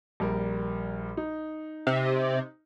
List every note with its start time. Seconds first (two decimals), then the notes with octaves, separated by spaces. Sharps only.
0.20 A#1 G3 A#4
1.17 D#4
1.87 C3